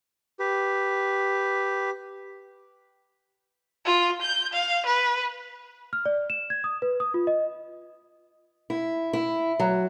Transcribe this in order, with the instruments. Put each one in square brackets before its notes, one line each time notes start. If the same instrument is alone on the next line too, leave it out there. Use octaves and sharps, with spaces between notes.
[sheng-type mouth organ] G4 B4
[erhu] F4
G6
F5
B4
[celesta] F6
D5
E7
G#6
D#6
B4
D#6
F4
D#5
[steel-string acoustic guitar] E4
E4
F#3